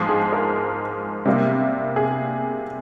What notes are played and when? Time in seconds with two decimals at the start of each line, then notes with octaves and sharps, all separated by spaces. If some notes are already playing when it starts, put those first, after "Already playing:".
Already playing: G#2 F3 G#3
0.09 G#4
0.32 A#4
1.25 C3 G3 A#3
1.96 G#4